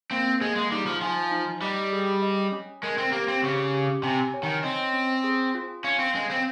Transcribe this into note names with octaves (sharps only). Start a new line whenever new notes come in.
A#3 C4
G#3 G#4
G#3
G3 D#4
F3
F3 G#5
D#4
G3 D#5
G#4
D#5
C#4
G#3 A#4
C4
A#3 G4
C4
C#3 G4
G4
C3 G#5
C#5
D#3
C4 D#5
C#4
G#4
F4
C#4 F5
C4
G#3 C#4
C4